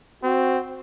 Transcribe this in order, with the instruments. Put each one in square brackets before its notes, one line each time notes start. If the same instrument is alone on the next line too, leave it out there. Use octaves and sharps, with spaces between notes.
[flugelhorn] C4 [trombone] F#4